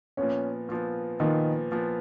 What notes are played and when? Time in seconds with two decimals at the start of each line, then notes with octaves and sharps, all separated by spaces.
0.17 A#2 F3 B3 C#4
0.69 A#2 F3 B3
1.20 A#2 D#3 F3 B3
1.72 A#2 F3 B3